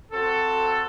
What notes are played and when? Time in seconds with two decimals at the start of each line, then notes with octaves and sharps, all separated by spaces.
0.12 C4 F#4 A4